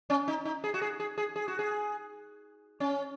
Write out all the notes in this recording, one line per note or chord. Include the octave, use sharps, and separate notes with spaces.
C#4
D#4
D#4
G#4
F#4
G#4
G#4
G#4
G#4
F#4
G#4
C#4